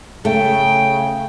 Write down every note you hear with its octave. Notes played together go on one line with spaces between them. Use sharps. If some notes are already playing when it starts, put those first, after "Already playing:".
C#3 A3 G5